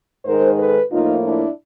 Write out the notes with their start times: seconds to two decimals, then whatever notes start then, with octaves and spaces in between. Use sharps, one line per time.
0.25 G#2 D#3 G#3 A#4 C5
0.58 A4 B4
0.91 A2 F3 A#3 D#4 F4
1.24 D4 E4